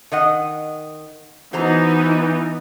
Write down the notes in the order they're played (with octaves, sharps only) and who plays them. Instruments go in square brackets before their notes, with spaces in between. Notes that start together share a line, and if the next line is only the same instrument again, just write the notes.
[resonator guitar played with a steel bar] D#3 D#5 F#5
[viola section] E3 B3 D#4 [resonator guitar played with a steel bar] F#4 C5 A#5